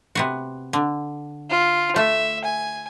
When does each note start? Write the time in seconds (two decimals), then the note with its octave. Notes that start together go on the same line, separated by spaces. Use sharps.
0.15 C3 B3 F#4
0.73 D3
1.50 F4
1.96 A3 E5
2.44 G#5